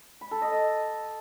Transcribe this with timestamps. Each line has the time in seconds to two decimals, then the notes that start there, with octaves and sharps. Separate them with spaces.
0.21 B5
0.31 A4
0.42 D#5
0.52 D#5